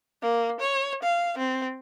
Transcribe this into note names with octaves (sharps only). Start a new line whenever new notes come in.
A#3
C#5
F5
C4